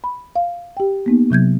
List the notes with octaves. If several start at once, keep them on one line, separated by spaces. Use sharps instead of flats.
B5
F5
G4 G5
A#3 B3 D#4
C3 F#3 G6 G#6